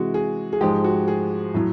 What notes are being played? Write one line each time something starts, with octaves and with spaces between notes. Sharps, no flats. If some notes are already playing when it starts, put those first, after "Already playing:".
Already playing: C3 E3 G#3 F#4
G#4
G#4
G#2 F3 G#3 G4
F#4
G#4
A2 F#3